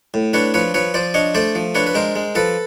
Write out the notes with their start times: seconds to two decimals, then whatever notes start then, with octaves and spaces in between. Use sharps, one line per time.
0.14 A2
0.33 D4 B4 C#5
0.54 F3 B4 C#5
0.74 F3 B4 C#5
0.94 F3 C5 D5
1.14 D4 C#5 D#5
1.35 A3 C5 D5
1.55 F3
1.75 D4 B4 C#5
1.87 B4
1.95 G#3 A#4 C5
2.16 G#3
2.35 F3 A4 B4